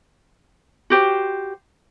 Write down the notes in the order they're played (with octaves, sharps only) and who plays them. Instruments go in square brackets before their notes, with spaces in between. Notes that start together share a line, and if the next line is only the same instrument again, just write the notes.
[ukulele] F#4 G4 C5